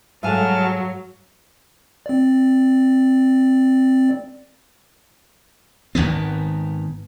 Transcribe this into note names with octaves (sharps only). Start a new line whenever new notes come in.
G#2 F#3 G3 A4 F5 G#5 A5 F6
C4 D5
G#1 D#2 D#3 B3